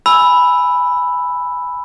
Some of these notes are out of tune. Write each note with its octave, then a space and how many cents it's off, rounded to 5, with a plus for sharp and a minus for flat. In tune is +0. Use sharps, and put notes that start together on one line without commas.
G#5 +0 B5 +0 E6 +0